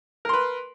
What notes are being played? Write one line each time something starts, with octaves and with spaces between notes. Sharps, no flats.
A#4 B4 C6